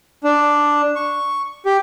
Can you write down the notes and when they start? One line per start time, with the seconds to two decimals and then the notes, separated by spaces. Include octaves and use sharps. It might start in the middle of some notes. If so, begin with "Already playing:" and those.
0.24 D4
0.96 C#6
1.66 G4